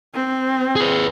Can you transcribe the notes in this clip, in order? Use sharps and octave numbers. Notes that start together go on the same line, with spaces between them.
C4
G#4 B4